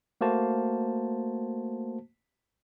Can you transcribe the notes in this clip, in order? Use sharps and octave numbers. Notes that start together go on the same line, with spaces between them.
A3 A#3 F#4 C5 A5